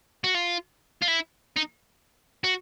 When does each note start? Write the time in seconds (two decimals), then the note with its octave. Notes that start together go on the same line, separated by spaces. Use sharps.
0.24 F#4
0.35 F4
1.02 F4
1.08 E4
1.56 D#4
2.44 F#4